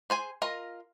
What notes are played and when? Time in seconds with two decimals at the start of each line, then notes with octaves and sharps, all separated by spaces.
0.10 G#4 C5 G#5
0.42 F4 A#4 D#5